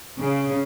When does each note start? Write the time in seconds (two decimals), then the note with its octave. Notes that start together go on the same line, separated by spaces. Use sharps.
0.19 C#3